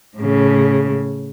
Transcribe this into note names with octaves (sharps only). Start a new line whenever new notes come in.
A2 C#3